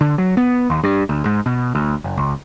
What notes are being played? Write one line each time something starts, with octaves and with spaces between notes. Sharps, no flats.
D3
F#3
B3
D#2
G2
D2
G#2
B2
D2
F#1
C#2